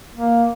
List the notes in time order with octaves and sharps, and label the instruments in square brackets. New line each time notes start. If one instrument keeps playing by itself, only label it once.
[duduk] A#3